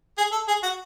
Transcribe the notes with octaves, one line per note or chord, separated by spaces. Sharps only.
G#4
A4
G#4
F#4